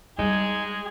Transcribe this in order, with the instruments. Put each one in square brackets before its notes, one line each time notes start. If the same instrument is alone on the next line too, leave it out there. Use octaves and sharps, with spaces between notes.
[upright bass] G3 [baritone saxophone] G#3 [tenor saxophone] D#4 [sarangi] G#4